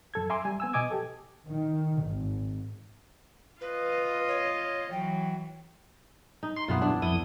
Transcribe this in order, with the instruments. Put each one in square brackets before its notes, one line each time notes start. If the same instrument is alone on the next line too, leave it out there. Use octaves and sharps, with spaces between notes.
[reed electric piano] F#2 A4 G#6
E5 G#5 A#5 C6 D6 E6
G3 G#5
B3 G#5 E6
B2 D#5 G#5 D6 D#6 G#6
G4 A4
[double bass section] D#3
G#1
[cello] F4 D#5 [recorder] B4
[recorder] C#5
[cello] E3 F#3 [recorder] G5
[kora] D#4
[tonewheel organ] C6
[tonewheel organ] F#2 B2 [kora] B3 E4 F4
[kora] D4 E4
[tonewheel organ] F2 D#6 [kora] E4